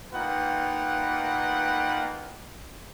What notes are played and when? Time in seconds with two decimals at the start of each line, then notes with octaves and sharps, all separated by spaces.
0.13 A#3 D#4 F4 B4 F#5 G5